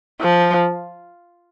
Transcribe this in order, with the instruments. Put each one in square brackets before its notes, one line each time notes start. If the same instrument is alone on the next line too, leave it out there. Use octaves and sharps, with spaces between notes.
[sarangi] F3